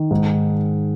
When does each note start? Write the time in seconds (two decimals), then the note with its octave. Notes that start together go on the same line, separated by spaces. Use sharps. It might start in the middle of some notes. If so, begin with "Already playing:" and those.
Already playing: D#3
0.11 G#2